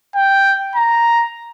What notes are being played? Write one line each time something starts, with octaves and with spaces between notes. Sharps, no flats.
G5
A#5